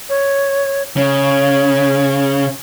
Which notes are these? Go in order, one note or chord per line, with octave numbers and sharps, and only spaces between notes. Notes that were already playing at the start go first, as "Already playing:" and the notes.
C#5
C#3 C#5